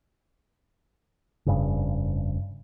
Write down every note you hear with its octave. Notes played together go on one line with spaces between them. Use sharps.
F1 G2 C#3